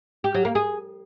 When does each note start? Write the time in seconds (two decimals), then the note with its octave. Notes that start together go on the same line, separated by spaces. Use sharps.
0.24 G4
0.34 F#3
0.45 A#3
0.55 G#4